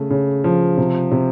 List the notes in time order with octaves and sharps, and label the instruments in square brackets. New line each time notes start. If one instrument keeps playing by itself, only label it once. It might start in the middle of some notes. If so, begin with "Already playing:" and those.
Already playing: [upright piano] C#3 A3
C#3
F3
C3
C3